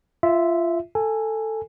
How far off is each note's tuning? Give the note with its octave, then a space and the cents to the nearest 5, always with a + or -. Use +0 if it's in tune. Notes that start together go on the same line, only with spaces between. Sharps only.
F4 -20 E5 +0
A4 +10 G#5 -5